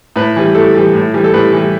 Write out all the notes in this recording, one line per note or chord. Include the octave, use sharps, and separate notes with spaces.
A2 B4
E3 G3
A2 A4
E3 G3
A2
E3 G3
A4
A2 B4
E3 G3